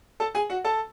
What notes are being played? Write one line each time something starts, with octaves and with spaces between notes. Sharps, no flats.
A4 A5
G#4 G#5
F#4 F#5
A4 A5